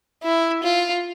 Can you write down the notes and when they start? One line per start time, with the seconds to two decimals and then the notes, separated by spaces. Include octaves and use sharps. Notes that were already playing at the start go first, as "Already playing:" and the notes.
0.23 E4
0.63 F4